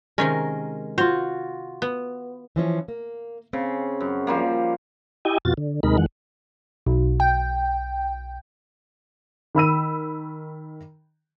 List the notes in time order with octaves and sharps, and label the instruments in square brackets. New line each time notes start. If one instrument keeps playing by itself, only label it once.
[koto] C3 D#3 C#4 [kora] G#3 A#4
[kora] F4 F#4 [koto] C5
[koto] B3
[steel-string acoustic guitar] E3 F3 C#4
A#3
[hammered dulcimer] C#3 [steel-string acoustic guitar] C4
[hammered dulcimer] F#2
F3 G3 A#3
[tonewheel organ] E4 G4 D#5 G5 G#5
F2 B2 F4 F#4 A6
D3
D#2 C3 G#3 D#4 A#4 B5
F2 D#3 E3 G#3 F#5
[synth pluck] B1
G5
[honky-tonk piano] D#3 B5 E6 D#7